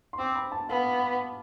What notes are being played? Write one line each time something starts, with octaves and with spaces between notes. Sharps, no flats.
C6
C4 D6
B5
A5
B3 F5